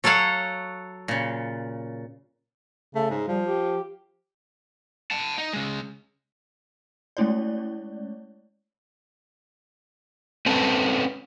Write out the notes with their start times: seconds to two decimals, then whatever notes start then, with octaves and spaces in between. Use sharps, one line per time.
0.04 F#3 A4 C#5 F5 F#5
1.08 A#2 C#3
2.95 C#3 A3
3.10 G#2
3.28 F3 G3
3.47 G4
5.11 F#5 A5
5.38 D#4
5.53 C#3 G#3
7.17 G#3 A3 C#4 E4 C#5 D5
10.46 C4 C#4 A4 B4